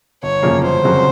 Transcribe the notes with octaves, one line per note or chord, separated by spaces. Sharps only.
G1 C#5
F#2 C#3 F3 A#3
G1 C5
F2 C#3 F#3 A#3